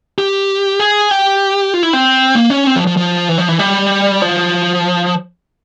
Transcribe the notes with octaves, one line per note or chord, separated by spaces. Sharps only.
G4
G#4
G4
F4
E4
C4
A#3
C#4
C4
F3
F3
F3
E3
F3
E3
G3
F3